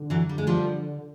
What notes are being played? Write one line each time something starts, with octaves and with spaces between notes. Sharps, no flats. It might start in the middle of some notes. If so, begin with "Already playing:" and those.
Already playing: D3
E3 F#3
G3
G#3
F3 G3